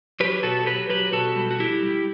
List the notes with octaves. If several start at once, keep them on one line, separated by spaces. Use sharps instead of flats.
F#3 G4 B4
B2 F#4 A4
F#3 G4 B4
F#3 G4 B4
B2 F#4 A4
G3
F#4
G3 E4 G4
G3